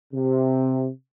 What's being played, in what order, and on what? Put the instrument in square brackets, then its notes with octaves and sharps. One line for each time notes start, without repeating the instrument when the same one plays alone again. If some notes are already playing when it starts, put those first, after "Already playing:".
[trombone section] C3